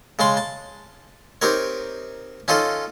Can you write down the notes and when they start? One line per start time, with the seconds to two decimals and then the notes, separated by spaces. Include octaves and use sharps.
0.19 C#3 G#3 A5 C6
0.37 A5
1.42 C4 D#4 G4 A#4 C#5
2.48 C#4 D#4 F4 A4 D#5